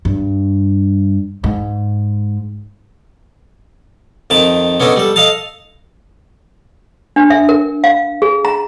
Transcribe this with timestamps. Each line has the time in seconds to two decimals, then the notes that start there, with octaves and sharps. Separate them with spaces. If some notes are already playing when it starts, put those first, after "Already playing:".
0.05 G2
1.44 G#2
4.30 F2 D#3 A5
4.80 B3 C#4 D4 A4 D#5
4.96 G3 A4
5.16 A4 D#5 F5 A5
7.16 D4
7.30 E5
7.49 A#4
7.84 F5
8.22 G#4
8.45 A#5